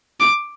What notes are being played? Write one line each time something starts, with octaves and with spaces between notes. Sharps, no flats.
D6